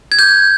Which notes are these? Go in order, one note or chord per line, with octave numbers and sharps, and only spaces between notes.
G#6
G6